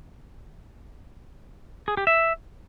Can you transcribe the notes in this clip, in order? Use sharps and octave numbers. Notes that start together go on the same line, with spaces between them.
G#4
G4
E5